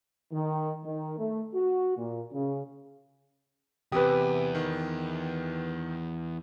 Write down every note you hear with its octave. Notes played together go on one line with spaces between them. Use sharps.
D#3
D#3
A3
F#4
A#2
C#3
E2 C3 G4 B4 D#6
D#3